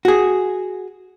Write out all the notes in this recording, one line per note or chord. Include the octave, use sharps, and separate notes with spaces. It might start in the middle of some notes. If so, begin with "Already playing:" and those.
F#4 G#4